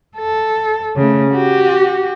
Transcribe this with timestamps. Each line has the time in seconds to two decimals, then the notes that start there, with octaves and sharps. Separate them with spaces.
0.18 A4
0.97 C#3 A3
1.32 F#4 G4